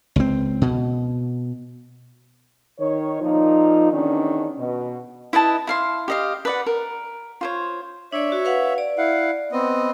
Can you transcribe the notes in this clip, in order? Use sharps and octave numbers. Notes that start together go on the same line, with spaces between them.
C#2 C4
B2
D#3 C#5
A#2 F3 D#4
E2 D#3 C#4 D4
B2
E4 B4 D#5 A5
E4 F5 C6
G4 D#5 F5
B4 D5 F#5
A#4
F4 C5 C#5
D4 C#5 D5 E5
F#4
B4 F5 F#5
D5
E4 F5 F#5
B3 C4 D#5